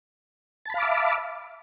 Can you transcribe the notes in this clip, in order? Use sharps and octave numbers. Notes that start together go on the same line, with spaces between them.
E5 F5 A5 B5 D6